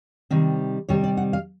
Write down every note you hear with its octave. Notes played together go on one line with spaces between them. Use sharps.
C3 D#3 G3 C4
C3 D#3 G3 C4 C#5
D5
F#5
F5